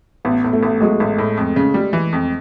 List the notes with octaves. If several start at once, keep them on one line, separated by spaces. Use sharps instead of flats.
A1 B3
A2
A3
A1
F#3 G#3
A1
A2
F2
C#3
G3
E3
F2